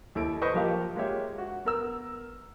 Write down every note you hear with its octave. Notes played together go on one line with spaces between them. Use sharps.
D#2 E4 A4 D7
B4 C5 D#5 B5 C#6
F3 A#3 G4 A#4 F5
G#3 A#3 F4 G4 C#5 E5
F#4
B3 A#4 E6